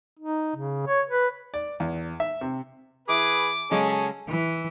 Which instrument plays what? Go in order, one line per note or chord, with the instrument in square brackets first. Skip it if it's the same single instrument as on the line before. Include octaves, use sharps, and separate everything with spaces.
[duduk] D#4
C#3
C#5
B4
[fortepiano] D5
E2
E5
C3
[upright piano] E3 E5 [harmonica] G#4 B4 [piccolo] D6
[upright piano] C#3 F#3 G#3 [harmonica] C#4 G#4 A4
[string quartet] E3